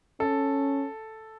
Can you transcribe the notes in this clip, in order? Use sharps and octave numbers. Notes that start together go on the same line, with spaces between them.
C#4 A4